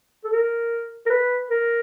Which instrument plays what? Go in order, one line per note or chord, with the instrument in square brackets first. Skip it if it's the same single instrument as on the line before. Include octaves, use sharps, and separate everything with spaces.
[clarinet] A4
A#4
A#4
B4
A#4